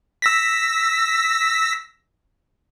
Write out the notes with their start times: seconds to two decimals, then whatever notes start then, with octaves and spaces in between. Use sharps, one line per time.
0.22 E6 A#6 B6